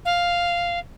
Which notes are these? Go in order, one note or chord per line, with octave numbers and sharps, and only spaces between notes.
F5